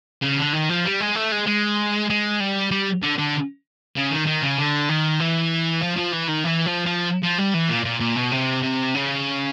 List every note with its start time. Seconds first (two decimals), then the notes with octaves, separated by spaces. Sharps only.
0.22 C#3
0.37 D3
0.53 D#3
0.69 F3
0.85 G3
1.01 G#3
1.16 A3
1.32 G#3
1.47 G#3
2.10 G#3
2.40 G3
2.71 G3
3.02 D3
3.18 D3
3.96 C#3
4.12 D#3
4.27 D#3
4.42 C#3
4.59 D3
4.89 D#3
5.20 E3
5.83 F3
5.98 F3
6.14 E3
6.29 D#3
6.45 E3
6.66 F3
6.86 F3
7.23 F3
7.38 G3
7.54 E3
7.69 A#2
7.85 A#2
8.00 A#2
8.16 B2
8.31 C3
8.63 C3
8.94 C#3